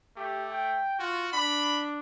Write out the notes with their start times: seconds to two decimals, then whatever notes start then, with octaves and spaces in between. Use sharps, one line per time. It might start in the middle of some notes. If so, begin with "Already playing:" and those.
0.17 A3 G4
0.51 G5
0.99 F4 F#4
1.33 D4 B5